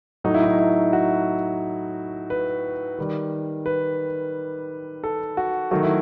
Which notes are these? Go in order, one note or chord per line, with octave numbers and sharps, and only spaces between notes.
A2 F#3 A3 D#4
E4
D#4
E4
F#4
B4
D#3 G3
B4
A4
F#4
D#3 F#3 A3 F#4
E4